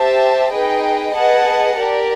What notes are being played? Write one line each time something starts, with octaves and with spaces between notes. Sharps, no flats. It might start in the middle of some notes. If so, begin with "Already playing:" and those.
Already playing: G4 C5 E5 A5
D#4 G#4 B4 D#5 G5
G#4 B4 D#5 F#5 A5
G4 A#4 D5